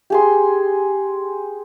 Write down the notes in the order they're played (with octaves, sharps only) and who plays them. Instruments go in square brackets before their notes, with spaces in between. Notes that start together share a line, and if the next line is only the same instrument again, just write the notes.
[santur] G4 G#4 C6